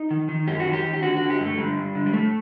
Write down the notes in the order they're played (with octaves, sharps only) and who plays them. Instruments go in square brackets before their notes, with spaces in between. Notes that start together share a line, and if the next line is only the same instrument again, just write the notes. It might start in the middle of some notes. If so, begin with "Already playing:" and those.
Already playing: [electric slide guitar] D#4
D#3
D#3
F#2 G4
F#4
D#3
G4
D#3
G4
D3 F#4
F#4
D3
G4
G2 A3
D3 G3
G2
D3
G3
A2 A3